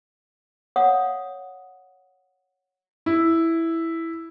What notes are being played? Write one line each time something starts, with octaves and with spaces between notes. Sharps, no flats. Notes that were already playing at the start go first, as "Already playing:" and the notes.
C#5 F5 F#5 D#6
E4